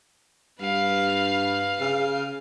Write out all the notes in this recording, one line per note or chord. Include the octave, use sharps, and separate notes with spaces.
G2 B4 F5
C#3 F5